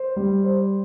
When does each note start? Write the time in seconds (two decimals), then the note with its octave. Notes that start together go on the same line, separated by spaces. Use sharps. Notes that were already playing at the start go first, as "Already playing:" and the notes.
Already playing: C5
0.16 G3
0.44 C5